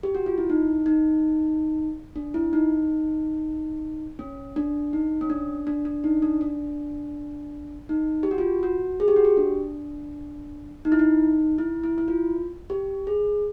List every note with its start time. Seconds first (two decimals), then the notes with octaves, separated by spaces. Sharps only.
0.03 G4
0.15 F#4
0.26 F4
0.38 E4
0.50 D#4
0.86 D#4
2.16 D4
2.34 E4
2.53 D#4
4.19 C#4
4.56 D4
4.93 D#4
5.21 C#4
5.30 D4
5.67 D4
5.85 D4
6.04 D#4
6.22 D4
6.41 D4
7.89 D#4
8.23 G4
8.31 F#4
8.38 F4
8.63 F#4
9.00 G#4
9.08 G4
9.16 F#4
9.25 G4
9.37 D4
10.85 D#4
10.92 E4
10.99 D#4
11.58 E4
11.84 E4
11.98 E4
12.08 F4
12.70 G4
13.07 G#4